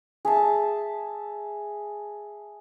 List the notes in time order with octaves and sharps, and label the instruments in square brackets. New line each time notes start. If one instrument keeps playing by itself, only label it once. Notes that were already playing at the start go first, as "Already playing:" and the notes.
[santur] G#4 E5 A5